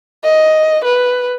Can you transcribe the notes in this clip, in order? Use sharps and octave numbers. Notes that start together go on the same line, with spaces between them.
D#5
B4